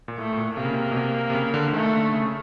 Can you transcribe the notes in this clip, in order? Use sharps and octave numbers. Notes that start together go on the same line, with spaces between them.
A#2
A2 A3
A2
A#2
C3 A#3
C#3
C3
B2
C3
C3
C#3
D3
D3
D#3 A3
D3
C#3